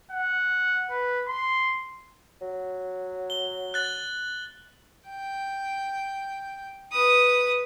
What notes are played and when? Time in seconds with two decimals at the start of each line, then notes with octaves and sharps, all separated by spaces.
0.11 F#5
0.90 B4
1.28 C6
2.42 F#3
3.30 G7
3.74 F#6 A6 F#7
5.09 G5
6.92 B4 D#6